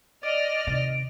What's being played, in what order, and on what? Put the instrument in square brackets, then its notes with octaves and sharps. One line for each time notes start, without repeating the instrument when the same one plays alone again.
[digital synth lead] D5 [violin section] D#5 F6 [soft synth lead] D7
[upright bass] D#2 C3